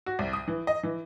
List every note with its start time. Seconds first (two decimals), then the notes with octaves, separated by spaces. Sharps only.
0.06 F#4
0.19 C2
0.33 D#6
0.48 E3
0.67 D#5
0.83 E3